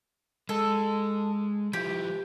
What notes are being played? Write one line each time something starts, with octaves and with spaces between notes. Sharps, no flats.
G#3 A4
F3 E4 G4